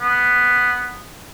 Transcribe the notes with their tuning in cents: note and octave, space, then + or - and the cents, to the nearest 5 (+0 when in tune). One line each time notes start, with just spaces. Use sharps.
B3 +0